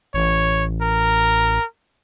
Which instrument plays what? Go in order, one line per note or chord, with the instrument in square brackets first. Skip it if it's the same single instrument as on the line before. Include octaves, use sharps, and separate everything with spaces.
[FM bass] A1 [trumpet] C#5
[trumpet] A#4